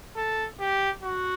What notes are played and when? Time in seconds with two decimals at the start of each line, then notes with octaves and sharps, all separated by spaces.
0.17 A4
0.60 G4
1.03 F#4